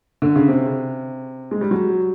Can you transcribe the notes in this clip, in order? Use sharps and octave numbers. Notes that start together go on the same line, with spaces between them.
D3
C#3
C3
G#3
G3
F#3